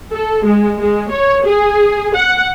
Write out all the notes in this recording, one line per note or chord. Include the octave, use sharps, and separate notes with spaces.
A4
G#3
G#3
C#5
G#4
F#5